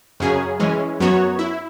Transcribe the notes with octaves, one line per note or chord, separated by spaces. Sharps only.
F#2 C#3 F#3 C#4 G#4
E3 G#3 C#4
F#2 F#3 B3 F#4 C#5
E4